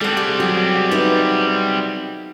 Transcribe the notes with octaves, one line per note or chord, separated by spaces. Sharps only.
G3 G#3 C4 G#4 A4 F#5
G4
F#3 F#4 G#4
B3 D#4 E5